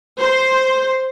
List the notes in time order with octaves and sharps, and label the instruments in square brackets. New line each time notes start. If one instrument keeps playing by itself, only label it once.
[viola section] C5